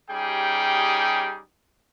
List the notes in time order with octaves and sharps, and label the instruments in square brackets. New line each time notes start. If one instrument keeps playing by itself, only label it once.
[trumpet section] G3 C#4 D#4 G4 G#4 G5